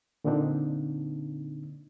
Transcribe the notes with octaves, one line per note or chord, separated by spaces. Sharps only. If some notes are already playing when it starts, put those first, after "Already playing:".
A#2 D3 A#3 C4 D4 D#4